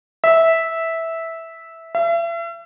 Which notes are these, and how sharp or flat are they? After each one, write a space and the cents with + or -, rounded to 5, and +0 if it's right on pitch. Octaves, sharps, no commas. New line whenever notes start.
E5 -10
E5 +40